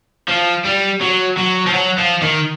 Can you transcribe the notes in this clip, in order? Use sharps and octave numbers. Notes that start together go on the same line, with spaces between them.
F3
G3
F#3
F#3
F3
F#3
F3
D#3